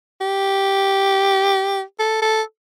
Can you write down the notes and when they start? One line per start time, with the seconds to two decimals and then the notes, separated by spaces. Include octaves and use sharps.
0.21 G4
2.00 A4
2.22 A4